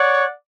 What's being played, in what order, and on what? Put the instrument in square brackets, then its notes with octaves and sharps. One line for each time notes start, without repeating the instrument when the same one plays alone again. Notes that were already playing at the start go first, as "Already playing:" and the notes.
Already playing: [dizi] C#5 [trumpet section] D5 F#5